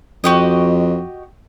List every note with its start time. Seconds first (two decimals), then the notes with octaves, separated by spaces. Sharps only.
0.24 F2 F#4 G4 D#5